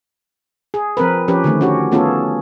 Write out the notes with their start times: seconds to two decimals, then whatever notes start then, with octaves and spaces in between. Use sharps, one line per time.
0.74 G#4
0.97 F3 C4 A#4 B4
1.28 F3 C#4 G4 B4
1.44 D3 D#3 A3
1.61 C#4 F#4 G4
1.92 A3 B3 C#4 F4 G#4 A4